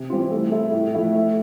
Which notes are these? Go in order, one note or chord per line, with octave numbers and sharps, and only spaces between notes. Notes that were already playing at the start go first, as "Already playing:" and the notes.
Already playing: C3
E3 G3 C4 F4
A3
E4 A4
A2
F3 A3 E4
A3